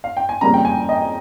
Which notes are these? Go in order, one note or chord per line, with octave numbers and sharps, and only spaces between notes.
F5
G5
G#5
F2 C#3 G3 A#3 A#5
G5
G#5
D#5